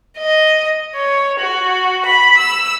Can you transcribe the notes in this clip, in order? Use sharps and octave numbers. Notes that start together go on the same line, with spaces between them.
D#5
C#5
F#4
B5
E6